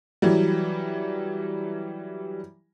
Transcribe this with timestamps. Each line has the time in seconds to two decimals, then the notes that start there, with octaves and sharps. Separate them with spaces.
0.22 E3 F#3 G3